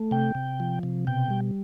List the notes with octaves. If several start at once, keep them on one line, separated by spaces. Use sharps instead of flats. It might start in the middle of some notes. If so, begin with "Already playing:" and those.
Already playing: A3
C3 G5
C3
F3
C3
B2 G5
G3